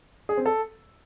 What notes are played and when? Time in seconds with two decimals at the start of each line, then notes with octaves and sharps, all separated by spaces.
0.29 G#4
0.37 C4
0.46 A4